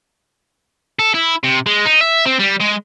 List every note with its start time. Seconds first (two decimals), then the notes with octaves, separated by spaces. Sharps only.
0.99 A4
1.14 E4
1.44 C3
1.66 G#3
1.85 D#4
2.01 E5
2.25 C4
2.39 G3
2.60 G#3